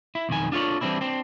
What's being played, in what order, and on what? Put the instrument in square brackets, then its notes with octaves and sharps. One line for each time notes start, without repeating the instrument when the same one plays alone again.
[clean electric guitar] E4
B1 F2 D#3 G#5
D4 F4 A4 C#5 D5
E3 G3 C4 D4 E4
C4 D4